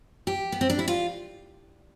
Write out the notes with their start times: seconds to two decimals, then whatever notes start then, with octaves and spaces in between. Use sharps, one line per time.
0.27 G4
0.52 B3
0.61 C4
0.70 D4
0.79 E4
0.88 F4